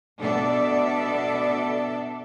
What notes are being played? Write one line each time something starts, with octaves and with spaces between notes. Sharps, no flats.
B2 D4 A4 D5 E5